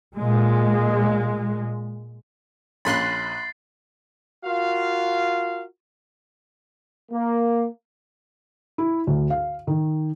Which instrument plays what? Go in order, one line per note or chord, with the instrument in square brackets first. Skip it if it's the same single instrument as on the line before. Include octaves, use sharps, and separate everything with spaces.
[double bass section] A#2 G#3
[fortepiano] A#1 C#4 [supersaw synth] B5 C6 F#6 [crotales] A6 C7
[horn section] F4 F#4 A#4 F5
A#3
[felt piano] E4
D2
F5
D#3